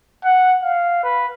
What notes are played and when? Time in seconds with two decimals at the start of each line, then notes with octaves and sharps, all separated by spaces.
0.24 F#5
0.62 F5
1.04 B4